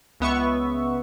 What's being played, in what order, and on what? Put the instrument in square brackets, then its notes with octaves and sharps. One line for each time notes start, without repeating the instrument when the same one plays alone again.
[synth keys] C#2 B3 E5 C#6